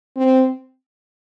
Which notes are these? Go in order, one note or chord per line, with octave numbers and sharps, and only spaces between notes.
C4